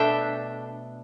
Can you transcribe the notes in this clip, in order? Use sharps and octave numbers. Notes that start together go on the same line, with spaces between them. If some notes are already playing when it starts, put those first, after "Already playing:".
Already playing: B2 A3 D4 E5 G5